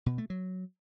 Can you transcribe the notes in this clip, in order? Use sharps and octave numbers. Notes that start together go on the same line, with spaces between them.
B2
A3
F#3